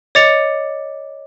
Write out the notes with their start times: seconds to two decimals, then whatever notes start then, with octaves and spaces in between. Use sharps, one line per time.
0.15 C#5 D#5 D6 A6 C#7 F7